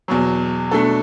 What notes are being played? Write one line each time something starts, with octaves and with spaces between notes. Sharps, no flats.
E2 B2 F#3
B2 A3 D4 A4